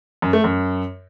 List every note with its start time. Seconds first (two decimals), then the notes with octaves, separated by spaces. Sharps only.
0.22 F#2
0.33 A3
0.44 F#2